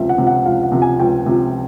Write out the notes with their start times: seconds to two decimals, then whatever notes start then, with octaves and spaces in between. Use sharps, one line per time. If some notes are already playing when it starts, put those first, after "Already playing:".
Already playing: C#2 C3 F3 E5
0.09 F#5
0.18 C3 F3
0.27 F#5
0.46 C#2 F5
0.63 F#5
0.72 C3 F3
0.82 G#5
0.99 C#2 G5
1.26 C3 F3